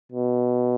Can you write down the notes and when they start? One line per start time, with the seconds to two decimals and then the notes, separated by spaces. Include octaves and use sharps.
0.12 B2